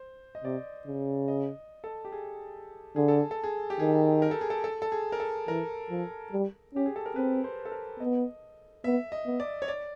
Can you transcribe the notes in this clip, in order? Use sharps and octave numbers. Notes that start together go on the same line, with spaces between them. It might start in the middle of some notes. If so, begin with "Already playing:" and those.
Already playing: C5
D#5
C3 D5
C#3
D#5
A4
G4
G#4
D3 G#4
A4
G#4
A4
G#4
G4
D#3 G#4
A#4
A4
G#4
A4
A4
A4
G#4
A#4
A4
E3 A#4
F3
G3
C#4 G4
G#4
A4
A#4
C4 B4
C5
A4
A#4
B3 D#5
B3 E5
D#5
B3
D5
C#5
D5